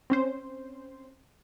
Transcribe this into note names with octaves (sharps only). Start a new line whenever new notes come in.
C4 C#4 C5